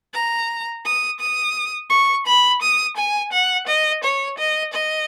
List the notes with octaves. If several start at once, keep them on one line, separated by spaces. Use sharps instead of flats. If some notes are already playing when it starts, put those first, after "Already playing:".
A#5
D#6
D#6
C#6
B5
D#6
G#5
F#5
D#5
C#5
D#5
D#5